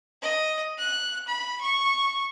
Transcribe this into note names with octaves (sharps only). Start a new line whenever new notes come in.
D#5
F#6
B5
C#6